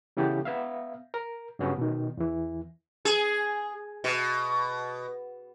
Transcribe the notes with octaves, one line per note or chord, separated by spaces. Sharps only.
C#3 E3 B3 G4 A4
B3 E5 F5
A#4
G2 C#3 F#3 B3 C#4
B2 D#3
E2 E3
G#4
B2